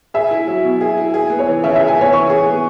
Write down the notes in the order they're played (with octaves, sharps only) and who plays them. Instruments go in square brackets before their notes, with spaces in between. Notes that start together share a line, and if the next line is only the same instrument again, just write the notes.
[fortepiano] G#4 [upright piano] E5
[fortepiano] E4
F#3
B2
G#4
E4
G#4
B3
[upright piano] C#5
[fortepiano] E3
[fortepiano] C#3 [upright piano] E5
[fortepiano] G#4 [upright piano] E5
[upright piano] G#5
[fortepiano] B3 [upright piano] C#5
[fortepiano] E3 [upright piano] C#6
[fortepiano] G#4
B3